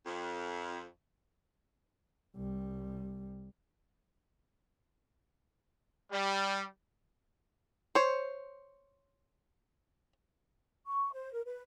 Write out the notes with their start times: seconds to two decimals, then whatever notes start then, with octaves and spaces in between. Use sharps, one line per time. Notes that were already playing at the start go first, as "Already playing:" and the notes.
0.06 F2
2.36 C2 G3
6.12 G3
7.95 C5 C#5
10.87 C#6
11.13 C5
11.33 A#4
11.46 B4